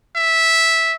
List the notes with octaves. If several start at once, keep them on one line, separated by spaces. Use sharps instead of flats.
E5